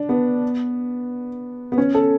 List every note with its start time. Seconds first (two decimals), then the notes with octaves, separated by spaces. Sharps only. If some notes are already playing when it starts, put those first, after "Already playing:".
Already playing: D4
0.09 B3
1.72 B3
1.78 C#4
1.95 A4